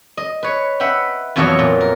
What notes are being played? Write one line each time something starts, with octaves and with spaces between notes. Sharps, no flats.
D#5
B4 C#5
B4 E5 F#5 G5
F2 B2 E3 F#3 C#5 F5
A#2
A#4